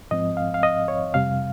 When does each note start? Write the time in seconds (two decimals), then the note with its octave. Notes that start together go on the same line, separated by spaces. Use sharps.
0.11 G#2 F3 C4 D#5
0.37 F5
0.54 F5
0.63 D#5
0.88 C#5
1.14 F2 C3 G3 F5